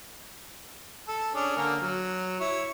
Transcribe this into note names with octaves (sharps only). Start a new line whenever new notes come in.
A4
C#4 D4 G#4
D3 A#3 F6
F#3
E4 C#5